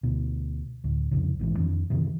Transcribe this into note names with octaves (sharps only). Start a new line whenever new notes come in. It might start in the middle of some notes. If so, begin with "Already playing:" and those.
D2 B2
D2 A2
C2 F2 C#3
A#1 G#2 B2 E3
F2 D#3 D4
F#2 C3 D#3 E3